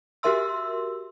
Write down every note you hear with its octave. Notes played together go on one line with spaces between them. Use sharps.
F#4 G4 A#4 E5 C6 E6